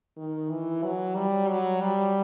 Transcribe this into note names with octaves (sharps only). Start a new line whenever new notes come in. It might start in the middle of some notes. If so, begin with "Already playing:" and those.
D#3
E3
F#3
G3
F#3
G3